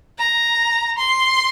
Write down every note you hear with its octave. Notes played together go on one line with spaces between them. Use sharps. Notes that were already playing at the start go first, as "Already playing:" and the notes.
A#5
C6